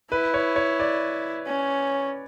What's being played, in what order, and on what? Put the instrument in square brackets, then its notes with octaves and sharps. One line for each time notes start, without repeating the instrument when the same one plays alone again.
[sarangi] E4 [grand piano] B4
[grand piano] C#5
C#5
D5
[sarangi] C#4